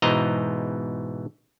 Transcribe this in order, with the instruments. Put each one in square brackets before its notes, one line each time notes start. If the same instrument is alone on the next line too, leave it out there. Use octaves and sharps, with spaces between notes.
[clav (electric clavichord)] G#2 B2 E3 C5 D#5 A#5